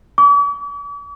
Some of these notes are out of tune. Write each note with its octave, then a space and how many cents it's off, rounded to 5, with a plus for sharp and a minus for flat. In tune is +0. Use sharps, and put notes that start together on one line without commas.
D6 -45